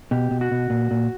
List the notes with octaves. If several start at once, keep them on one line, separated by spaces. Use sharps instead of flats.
B2 G4
B2
F#4
B2
A#2
A#2